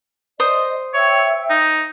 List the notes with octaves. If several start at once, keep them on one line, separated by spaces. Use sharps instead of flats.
C5 D5 D#5 D#6
C#5 E5 G5 E6
D#4